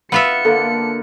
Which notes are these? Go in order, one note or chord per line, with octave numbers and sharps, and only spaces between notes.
B3 F4 E5 C#7
D3 A#3 A4